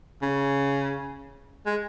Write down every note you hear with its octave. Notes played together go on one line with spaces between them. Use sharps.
C#3
G#3